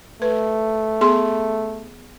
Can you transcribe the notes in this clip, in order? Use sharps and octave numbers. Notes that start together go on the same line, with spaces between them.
A3 B4
B3 G#4 C6